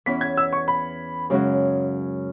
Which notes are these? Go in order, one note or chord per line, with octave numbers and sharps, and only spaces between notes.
E2 E3 C#4 B6
G#6
E6
C#6
B5
F#2 C#3 G#3 C#4 F#4